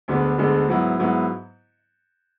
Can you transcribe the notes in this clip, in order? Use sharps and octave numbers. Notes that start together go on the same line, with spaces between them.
D2 D3 G#3 B3
D2 D3 G#3 B3
G#2 F#3 B3 E4
G#2 F#3 B3 E4